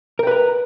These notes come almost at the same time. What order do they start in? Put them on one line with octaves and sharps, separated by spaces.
A#4 G5 B4 A#5